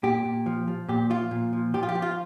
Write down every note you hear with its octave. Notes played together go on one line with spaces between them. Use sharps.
A#2 G4
A#2
F3
F3
A#2 G4
F3 F4
A#2
F3
F3 G4
F4
G4
F3
F4